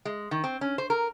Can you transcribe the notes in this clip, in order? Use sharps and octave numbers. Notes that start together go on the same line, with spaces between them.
G#3
D#3
C4
C#4
C5
A#4